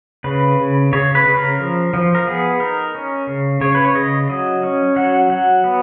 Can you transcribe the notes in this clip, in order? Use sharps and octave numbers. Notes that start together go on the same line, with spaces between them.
C#3 B4
C#3
C#3 C#5
B4
C#3
A#4
F3
F3
A#4
B3 G#4
D#4 A#4
C#4
C#3
C#3 C#5
B4
C#5
C#3 D#5
F#3 D#5
C#4
F#3 F#5
F#3 F#5
B3